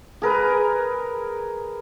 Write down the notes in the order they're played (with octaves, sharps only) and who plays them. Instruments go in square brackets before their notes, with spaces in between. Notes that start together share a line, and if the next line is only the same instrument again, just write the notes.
[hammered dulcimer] G#4 A#4 B4